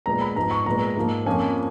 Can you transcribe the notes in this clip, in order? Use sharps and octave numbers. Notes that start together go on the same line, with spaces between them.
A#2 G#3 B3 A#5
B5
G#2 F3 B3 A#5
C#6
A#2 G#3 B3 A#5
G#2 F3 A#3
F2 F3 A#3 C#4 G#5